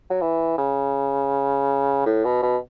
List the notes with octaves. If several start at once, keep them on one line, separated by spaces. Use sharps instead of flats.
F#3
E3
C#3
A2
B2
B2